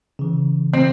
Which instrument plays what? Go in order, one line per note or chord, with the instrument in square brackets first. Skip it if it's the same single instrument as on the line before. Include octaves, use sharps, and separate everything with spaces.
[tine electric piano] C#3 E3
[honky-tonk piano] C4